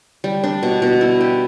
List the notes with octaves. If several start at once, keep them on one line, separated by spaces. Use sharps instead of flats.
G3
D4
B2
B2
E4
G4